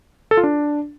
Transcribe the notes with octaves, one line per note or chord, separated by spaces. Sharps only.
A4
F4
D4